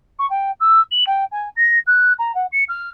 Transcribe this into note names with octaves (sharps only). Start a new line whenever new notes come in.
C#6
G5
E6
F#7
G5
G#5
A#6
F#6
A#5
F#5
C#7
F6